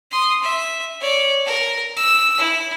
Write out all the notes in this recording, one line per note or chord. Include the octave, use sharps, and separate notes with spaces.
C6 D#6
E5
C#5 D5
A#4
E6
E4